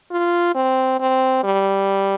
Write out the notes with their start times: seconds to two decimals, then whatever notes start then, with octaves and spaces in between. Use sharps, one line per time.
0.11 F4
0.55 C4
1.00 C4
1.44 G3